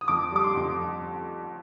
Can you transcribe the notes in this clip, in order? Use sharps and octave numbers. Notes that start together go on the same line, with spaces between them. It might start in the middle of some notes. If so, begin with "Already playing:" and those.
D#6
F2 D6
G3 D6
C6
F2